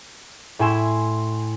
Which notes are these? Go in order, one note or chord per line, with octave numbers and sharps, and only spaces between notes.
A2 E4 G#5 C6 E7